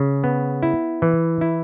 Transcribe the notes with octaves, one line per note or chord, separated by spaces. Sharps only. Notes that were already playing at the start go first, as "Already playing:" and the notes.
Already playing: C#3
B3
E4
E3
E4